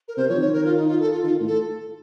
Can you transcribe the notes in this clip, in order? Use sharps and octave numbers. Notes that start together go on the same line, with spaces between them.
A#4
C3 C5
F3 C#5
D#3
C#5
A#4
F4
D#4
F4
A4
F4
D#3 F4
A2
A4